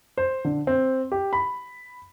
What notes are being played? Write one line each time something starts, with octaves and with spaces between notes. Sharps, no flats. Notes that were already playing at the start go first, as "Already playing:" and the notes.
C5
D3
C4
G4
B5